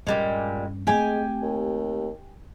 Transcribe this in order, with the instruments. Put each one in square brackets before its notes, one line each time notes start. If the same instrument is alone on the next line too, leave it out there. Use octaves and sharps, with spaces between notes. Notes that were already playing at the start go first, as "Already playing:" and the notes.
[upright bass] G2 C#4 [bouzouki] A#2 G3 G#3
[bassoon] G#3 [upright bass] A3 C4 [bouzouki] G4 G5 G#5
[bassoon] D#2